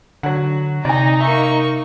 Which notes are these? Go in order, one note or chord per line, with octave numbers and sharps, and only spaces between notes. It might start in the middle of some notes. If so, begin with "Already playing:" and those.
D3 F#3 F#5
C3 D#4 D5 G#5 A#5
A#3 E5 C#6